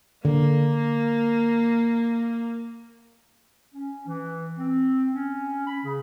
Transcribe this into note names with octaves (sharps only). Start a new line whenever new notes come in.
D3 A#3
C#4
E3
C4
C#4
B5
C#3